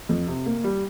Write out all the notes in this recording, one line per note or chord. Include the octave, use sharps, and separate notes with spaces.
F2
C3
A#3
G3